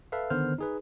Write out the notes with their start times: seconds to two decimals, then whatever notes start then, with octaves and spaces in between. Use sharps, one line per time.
0.12 A4 B4 E5 F5
0.30 D3 D#3 B3 C5 F6
0.58 D#4 G#4 B4